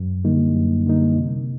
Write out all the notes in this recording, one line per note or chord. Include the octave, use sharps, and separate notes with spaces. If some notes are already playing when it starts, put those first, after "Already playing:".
Already playing: F#2
D3 G3 A#3 D#4
F#2
D3 G3 A#3 D#4
C3